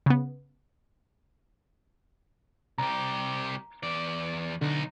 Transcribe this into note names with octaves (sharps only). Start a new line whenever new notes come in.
C#3 B3
C2 G4 A#5
E2 D5
B1 D3 D#4